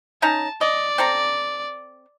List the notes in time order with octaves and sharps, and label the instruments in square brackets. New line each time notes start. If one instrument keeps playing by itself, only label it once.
[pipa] C#4 D#4 A#5 [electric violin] A5
[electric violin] D5 [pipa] D#5
[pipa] C4 A4 A#5